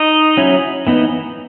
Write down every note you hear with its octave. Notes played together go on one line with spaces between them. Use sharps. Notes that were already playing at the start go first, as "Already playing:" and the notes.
Already playing: D#4 D#5
F#3 C#4 E4
E3 B3 D#4